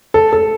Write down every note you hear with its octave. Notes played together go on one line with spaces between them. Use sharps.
A4
A4